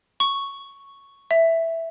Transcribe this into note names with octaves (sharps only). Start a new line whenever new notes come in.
C#6
E5